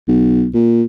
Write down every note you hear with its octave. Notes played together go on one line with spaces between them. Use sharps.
B1
A#2